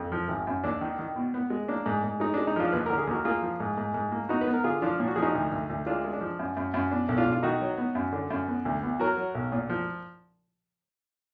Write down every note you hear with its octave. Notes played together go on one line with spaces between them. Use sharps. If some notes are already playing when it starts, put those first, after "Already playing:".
Already playing: F2
F3
G#1
F#2
D#2 D4
D#3
D#3
B2
B3
G#3
A#3 D4
G#2
G#2
G#3 D#4
G#3 D4
D#4
F3 D4 F4
D#2 B4
D3 A#4
G#4
D#2 F#4 A#4
A#3 F4 G#4
F3
G#2
G#2
G#2
A#3
B3 D#4 F#4
B4
B3
A#4
D3 F4 G#4
F3 D4 F4
A#2
F#4
F3 G#4
D#4 F#4
D2
D2
D2
G#3 D4 F4
G#3
D4
F3
F#2
F#2
F#2
B2 D4
B1
D4 F4
B1
F4
D#3 D#4 F#4
F#3
B3
F#2
D3
F#2
B3
D2
B3
F#3 F#4 A#4
F#3
B1
A#2
F3